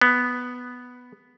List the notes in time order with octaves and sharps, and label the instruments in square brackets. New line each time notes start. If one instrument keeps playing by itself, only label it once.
[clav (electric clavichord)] B3